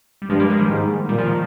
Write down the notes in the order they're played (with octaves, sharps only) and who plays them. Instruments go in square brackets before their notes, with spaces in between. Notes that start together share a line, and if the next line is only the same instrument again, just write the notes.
[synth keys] G3
[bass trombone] G2 [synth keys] F3 G#3
[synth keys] G3 A#3
F3 G#3
D#3 G3
[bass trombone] G#2
[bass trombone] A#2 [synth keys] G3
[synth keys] F3
D#3